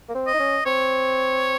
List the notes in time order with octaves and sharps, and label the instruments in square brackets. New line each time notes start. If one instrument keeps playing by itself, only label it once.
[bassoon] A#3
C4
[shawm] D#5
[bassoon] D#4
C#4
[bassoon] C4 [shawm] C#5